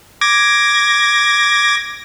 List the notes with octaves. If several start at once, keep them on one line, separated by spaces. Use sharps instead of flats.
D6 G#6 A#6